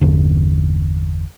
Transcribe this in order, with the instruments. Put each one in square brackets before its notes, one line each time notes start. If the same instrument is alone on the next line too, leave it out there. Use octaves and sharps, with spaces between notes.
[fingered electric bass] G1 E2 D3